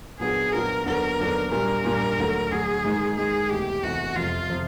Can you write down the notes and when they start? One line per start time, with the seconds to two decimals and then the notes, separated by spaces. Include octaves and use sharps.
0.20 A#2 F#3 B3 D4 F4 G#4
0.52 A#2 F#3 B3 D4 F4 A#4
0.85 D#2 D3 F#3 B3 D4 A#4
1.19 D#2 D3 F#3 B3 D4
1.51 A#2 G3 A#3 D4 A#4
1.85 A#2 G3 A#3 D4
2.18 D2 D3 F#3
2.50 D2 D3 F#3 G#4
2.84 G#2 D#3 G#3
3.17 G#2 D#3 G#3 G#4
3.50 E1 D2 C3 E3 G4
3.83 E1 D2 C3 E3 F#4
4.16 F2 C3 F3 F4
4.50 C3 F3